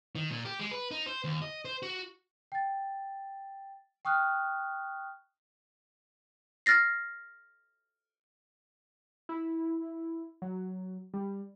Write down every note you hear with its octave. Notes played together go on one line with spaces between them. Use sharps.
D#3
A#2
G4
G#3
B4
D#4
C5
D#2
D#5
C5
F#4
G5 A6
G5 C#6 D#6 F6 F#6
F6 A6 A#6 C7
E4
F#3
G3